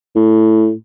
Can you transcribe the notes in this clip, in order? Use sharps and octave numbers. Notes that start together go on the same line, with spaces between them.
A2